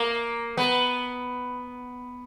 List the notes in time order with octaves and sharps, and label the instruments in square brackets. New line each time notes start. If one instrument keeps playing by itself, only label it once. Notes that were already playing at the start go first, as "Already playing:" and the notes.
Already playing: [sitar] A#3
B3